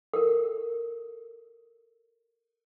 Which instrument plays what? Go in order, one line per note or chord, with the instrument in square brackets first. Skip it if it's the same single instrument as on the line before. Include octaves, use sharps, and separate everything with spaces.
[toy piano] A4 A#4